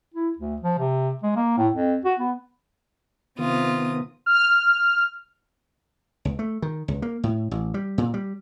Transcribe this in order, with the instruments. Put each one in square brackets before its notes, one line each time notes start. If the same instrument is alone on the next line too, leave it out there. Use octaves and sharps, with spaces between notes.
[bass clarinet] E4
D2
F3
C3
G#3
A#3
A2
F2
F#4
B3
[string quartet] C3 F4 D#6 [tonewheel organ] D#3 B3
[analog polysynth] F6
[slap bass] C#2
A3
D#3
C#2
A#3
A2
A1
G3
A#2
G3